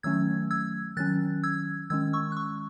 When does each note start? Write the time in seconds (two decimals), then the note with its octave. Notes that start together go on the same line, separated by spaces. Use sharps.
0.03 D#3 F#3 A3 C#4 E6 G#6
0.51 E6 G#6
0.97 D#3 F#3 C#4 F#6 A6
1.43 E6 G#6
1.90 D#3 G#3 C#4 E6 G#6
2.13 C#6 E6
2.32 F#6
2.36 C#6 E6